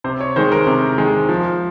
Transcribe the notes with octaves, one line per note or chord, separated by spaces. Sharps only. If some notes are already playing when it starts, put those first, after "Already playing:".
C3 C5
C#5
D#3 G#3 C5
A#4
C3
D#3 G#3
F3